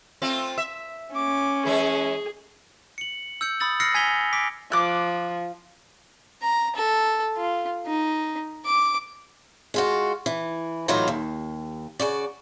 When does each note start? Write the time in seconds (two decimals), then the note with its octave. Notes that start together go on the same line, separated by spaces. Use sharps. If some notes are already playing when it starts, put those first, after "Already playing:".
0.22 A3 C4 F4
0.58 E5
1.15 C#4 D6
1.65 E3 G#3 G#4 C#5
2.98 C#7 F#7
3.41 E6 G6 C#7
3.60 B5 D#6 E6 A6 F#7
3.80 E6 F6 A#6 C7 C#7
3.94 G#5 G#6 B6 F7 G7
4.33 D6 B6 D7
4.72 F3 D6 F#6
6.42 A#5
6.76 A4
7.37 F4
7.86 D#4
8.66 D6
9.74 G#3 F4 F#4
10.26 E3
10.88 A2 E3 F#3 D#4 F4 A#5
11.08 D#2
11.99 C#3 F#4 D5